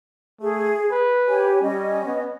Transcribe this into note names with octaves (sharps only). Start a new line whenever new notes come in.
A3 G#4
B4
G4 C#5 G#5
G3 C#4 D#5
B3